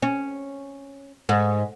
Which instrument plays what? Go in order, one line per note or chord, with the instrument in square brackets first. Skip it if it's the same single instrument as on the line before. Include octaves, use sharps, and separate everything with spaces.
[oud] C#4
G#2